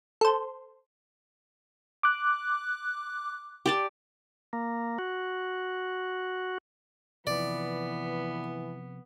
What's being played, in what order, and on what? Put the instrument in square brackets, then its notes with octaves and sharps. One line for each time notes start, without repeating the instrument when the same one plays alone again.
[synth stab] A4 C5
[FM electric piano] D6 F#6
[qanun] G4 D5 A5
[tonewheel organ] A#3
F#4
[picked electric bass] C3 F3 [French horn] E3 [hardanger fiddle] B3 [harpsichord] D5